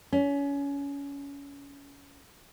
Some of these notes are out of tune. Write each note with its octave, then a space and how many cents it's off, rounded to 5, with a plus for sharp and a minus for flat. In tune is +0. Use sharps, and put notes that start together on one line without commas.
C#4 +25